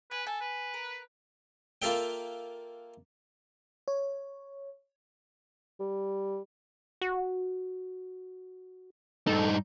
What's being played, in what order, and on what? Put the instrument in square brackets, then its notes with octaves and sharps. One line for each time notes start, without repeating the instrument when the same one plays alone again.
[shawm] B4 [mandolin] G#5
[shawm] A4 [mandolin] G#5
[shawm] B4
[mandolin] A#4
[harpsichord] A#3 F4 A4 E5 G5
[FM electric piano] C#5
[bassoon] G3
[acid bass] F#4
[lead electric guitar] G2 D#4 [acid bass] A4